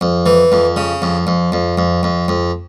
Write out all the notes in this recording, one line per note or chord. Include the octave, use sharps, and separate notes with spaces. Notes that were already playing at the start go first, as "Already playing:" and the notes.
F2
E3
F2
C#3
F2
F2
F2
F2
F2
F2